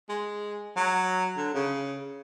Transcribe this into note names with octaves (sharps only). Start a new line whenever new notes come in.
G#3
F#3
D3
C#3